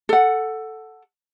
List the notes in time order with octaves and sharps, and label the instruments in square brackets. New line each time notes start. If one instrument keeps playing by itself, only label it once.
[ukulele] A4 F#5